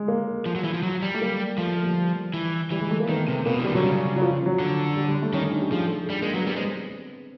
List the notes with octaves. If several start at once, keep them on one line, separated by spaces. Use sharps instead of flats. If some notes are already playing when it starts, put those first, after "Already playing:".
Already playing: G#3
A#3
F3
F#3
E3
F3
F#3
G3
A3
A#3
F3 A3
A#3
G3
E3
E3 G3
G#3
A3
A#3
D#3 B3
C3
B2 A#3
E3
G3
D#3
D3 F#3
C#3
F#3
F3
F#3
D3
G3
G3
A3
D#3 C#4
D4
D#4
G4
F3 G#4
A4
G#4
G3 D4
G#3 A#3
F#3 B3
G3 B3
G#3 C4